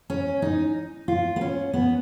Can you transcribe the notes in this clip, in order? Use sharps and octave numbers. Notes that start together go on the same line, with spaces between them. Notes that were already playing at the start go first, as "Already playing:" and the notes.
C#4
D#4
F4
B3
C#4
B3